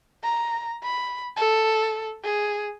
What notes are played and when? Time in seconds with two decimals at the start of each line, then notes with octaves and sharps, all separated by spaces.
0.24 A#5
0.83 B5
1.37 A4
2.24 G#4